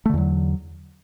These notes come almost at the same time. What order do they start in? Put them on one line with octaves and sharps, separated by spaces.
A3 D3 E2 F#3